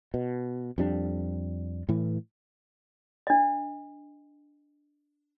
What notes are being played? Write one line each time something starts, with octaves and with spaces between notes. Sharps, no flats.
B2
F2 F3 G3 D4
A2 E3
D4 D#5